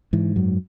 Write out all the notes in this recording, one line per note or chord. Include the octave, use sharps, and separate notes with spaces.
G#2 E3
F#2 F#3